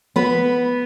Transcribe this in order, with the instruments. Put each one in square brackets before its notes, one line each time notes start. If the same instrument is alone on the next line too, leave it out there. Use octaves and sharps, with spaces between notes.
[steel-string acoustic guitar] B3 B4